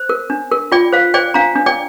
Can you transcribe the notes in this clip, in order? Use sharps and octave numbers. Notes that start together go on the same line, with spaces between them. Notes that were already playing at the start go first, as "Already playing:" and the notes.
Already playing: C5
A#4
D4
A#4
F4 D5 G5
C5 F5
C5 D5 G5
D4 F5 A#5
D4
D5 G5